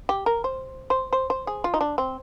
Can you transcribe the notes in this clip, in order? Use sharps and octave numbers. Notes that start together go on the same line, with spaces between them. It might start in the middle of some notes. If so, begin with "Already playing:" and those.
G4
A#4
C5
C5
C5
C5
G#4
F4
D#4
D4
C4